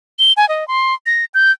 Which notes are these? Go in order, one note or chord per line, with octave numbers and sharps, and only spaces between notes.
G7
G#5
D#5
C6
A#6
G6